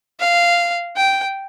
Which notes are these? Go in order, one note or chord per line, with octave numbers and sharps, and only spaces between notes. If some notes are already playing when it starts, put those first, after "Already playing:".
F5
G5